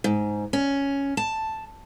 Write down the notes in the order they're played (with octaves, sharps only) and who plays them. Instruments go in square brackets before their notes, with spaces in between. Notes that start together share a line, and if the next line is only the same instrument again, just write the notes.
[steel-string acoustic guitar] G#2
C#4
A5